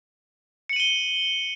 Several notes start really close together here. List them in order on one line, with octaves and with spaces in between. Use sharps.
C#7 F#7 D#7 G7